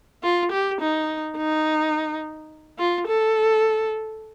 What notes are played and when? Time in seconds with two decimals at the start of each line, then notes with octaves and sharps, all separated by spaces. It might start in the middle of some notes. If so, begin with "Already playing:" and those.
0.23 F4
0.52 G4
0.81 D#4
1.37 D#4
2.78 F4
3.07 A4